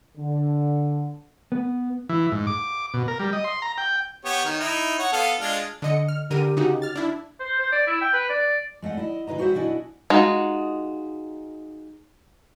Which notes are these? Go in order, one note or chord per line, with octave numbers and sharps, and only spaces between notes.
D3
B3
E3
G#2
D6
B2
A#4
G3
D#5
C6
A#5
G5
B3 G4 C#5
D#3
D#4 E4
C#5 F#5
B3 A4 F5
G#3 D4 F4
D3 D#5 C#7
F6
D3 G4 A#4 D#7
C#3 D#4 F#4
F6 A6
D4 E4
C5
C5
D5
E4
G5
B4
D5
G#3 A3 D#5 F#5
E4 D#5
C#3 E4 B4 D#5 A#5
G3 F#4 G#4 C5 E5
B2 D4 E4 F#4 D#5 G#5
G#3 D#4 F4 F#4